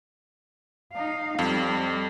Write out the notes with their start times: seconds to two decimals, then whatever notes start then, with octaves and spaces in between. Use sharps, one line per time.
0.93 D#4 F5
1.39 F2 G3